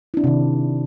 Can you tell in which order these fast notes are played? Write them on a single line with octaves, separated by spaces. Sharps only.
E4 D4 C4 C3 D#3